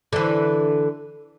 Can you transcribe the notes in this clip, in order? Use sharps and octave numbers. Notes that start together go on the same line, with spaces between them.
D3 E3